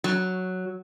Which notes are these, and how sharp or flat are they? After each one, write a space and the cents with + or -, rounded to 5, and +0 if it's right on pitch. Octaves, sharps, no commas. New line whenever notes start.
F#3 +0